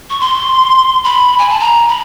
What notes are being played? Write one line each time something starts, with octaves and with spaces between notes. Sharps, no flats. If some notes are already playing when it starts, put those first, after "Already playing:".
C#6
C6
B5
G#5
A5
A#5
B5